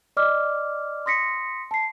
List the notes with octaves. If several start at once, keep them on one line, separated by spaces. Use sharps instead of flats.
D5 D#5 D6 F6
C6 D#6 A#6 B6 C#7
A5 C7